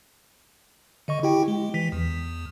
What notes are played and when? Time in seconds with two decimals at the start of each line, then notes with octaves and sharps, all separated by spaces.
1.08 D3 D#5 C#6
1.23 E4 G4 G5
1.48 G#3
1.74 E3 B6
1.92 E2